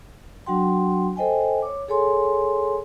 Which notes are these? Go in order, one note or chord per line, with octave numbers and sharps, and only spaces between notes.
F#3 D4 F#4 F#5 G5 C6
A4 C5 D#5 G5 G#5
C#5 D6
G#4 A4 C#5 G#5 C6